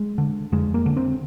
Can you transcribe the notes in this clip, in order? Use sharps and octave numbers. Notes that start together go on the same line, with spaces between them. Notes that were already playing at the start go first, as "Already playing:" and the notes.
Already playing: G#3
D3
F2 G#3
A#3
D3
C4